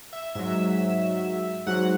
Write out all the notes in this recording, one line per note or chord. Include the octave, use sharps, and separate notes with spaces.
E5
G#2 F#3 E5
G#2 F#3 F#5